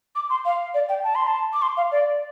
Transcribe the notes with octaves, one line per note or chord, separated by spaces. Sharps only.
D6
C6
F5
D5
G5
A5
C6
A5
D6
C6
F5
D5